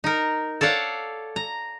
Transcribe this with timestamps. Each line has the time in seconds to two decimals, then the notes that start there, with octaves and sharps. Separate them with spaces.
0.04 D#4 A#4
0.61 A4 C#5 D5 F5 F#5
1.36 A#5